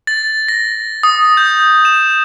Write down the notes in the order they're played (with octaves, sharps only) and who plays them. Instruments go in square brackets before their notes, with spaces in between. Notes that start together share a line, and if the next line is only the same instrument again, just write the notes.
[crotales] A6
A#6
D#6
G6
E7